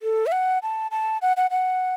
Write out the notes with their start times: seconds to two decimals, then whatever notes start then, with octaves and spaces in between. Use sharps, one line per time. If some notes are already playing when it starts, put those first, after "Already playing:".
0.03 A4
0.27 E5
0.32 F#5
0.63 A5
0.91 A5
1.22 F#5
1.37 F#5
1.51 F#5